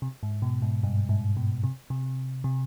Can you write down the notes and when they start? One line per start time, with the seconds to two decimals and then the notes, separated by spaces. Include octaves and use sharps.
0.02 C3
0.23 G#2
0.42 B2
0.62 G#2
0.83 G2
1.09 G#2
1.37 B2
1.64 C3
1.90 C3
2.44 C3